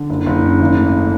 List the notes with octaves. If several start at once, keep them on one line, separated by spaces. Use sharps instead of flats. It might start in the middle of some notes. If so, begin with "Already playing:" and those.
Already playing: D3
F#1
F#1
C#3
G#1
A3